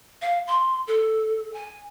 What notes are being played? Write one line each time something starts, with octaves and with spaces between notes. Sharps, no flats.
F5
C6
A4
G#5